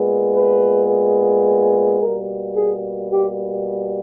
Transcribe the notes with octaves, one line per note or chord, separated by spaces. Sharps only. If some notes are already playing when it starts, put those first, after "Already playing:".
Already playing: A#2 G#3 B3
B4
B2 G3 A#3 A#4
G#4
G4